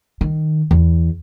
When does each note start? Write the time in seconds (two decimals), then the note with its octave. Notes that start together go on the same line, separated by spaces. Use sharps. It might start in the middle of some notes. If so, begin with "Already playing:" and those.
0.21 D#3
0.71 E2